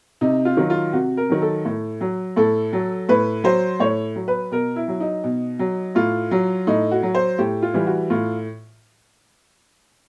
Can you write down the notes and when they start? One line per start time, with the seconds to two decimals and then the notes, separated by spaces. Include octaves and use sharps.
0.21 C3 D#4
0.45 F4
0.57 D#3 F#3
0.70 F4
0.93 C3 F#4
1.17 A#4
1.30 D#3 F#3
1.42 A4
1.65 A2
2.01 F#3
2.36 A2 A4
2.73 F#3
3.09 A2 B4
3.44 F#3 C5
3.80 A2 C#5
4.16 F#3
4.28 B4
4.51 B2 A#4
4.76 E4
4.88 F#3
5.00 D#4
5.24 B2
5.59 F#3
5.95 A2 F4
6.31 F#3
6.67 A2 D#4
6.91 F#4
7.02 F#3
7.15 C5
7.38 A2 G4
7.62 F4
7.74 E3 G3
7.87 F#4
8.10 A2 F4